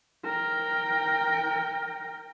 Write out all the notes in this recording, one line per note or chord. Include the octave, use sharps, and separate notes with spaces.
A#4 G5